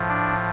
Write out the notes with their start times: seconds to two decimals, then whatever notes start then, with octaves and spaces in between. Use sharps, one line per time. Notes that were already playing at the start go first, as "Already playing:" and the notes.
Already playing: A2 F3
0.09 D4